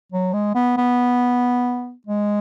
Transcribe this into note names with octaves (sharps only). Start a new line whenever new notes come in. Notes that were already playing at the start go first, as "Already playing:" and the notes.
F#3
G#3
B3
B3
G#3